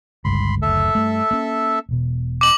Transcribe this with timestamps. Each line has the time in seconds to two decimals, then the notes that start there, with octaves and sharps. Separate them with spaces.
0.25 G1 C#2 G2 B5 C6
0.62 F#1 D2 A4 E5
0.95 G2 A3
1.31 A#3 C#4
1.89 E1 B2
2.41 D6 F#7